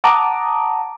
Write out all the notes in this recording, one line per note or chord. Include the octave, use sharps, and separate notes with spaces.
F#5 A5 A#5 D6 D#6